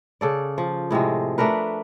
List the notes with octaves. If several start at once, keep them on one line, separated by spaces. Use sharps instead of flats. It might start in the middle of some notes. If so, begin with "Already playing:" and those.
C#3 A4 D5
F3
A2 C3 F3 G#3
A3 D4 A#4 B4